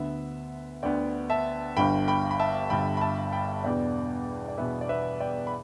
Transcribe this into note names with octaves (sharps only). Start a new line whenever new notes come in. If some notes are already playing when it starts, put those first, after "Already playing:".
Already playing: D2 D3 B3 B4 E5
D2 D3 B3 D5 G5
E5 A5
G1 G2 D3 G5 B5
G5 B5
B5
E5 A5
G1 G2 D3 G5 B5
B5
E5 A5
G5 B5
E2 B2 B3 D4 D5 G5
D5
E2 B2 B3 D4 B4 E5
D5
B4 E5
D5 G5
B5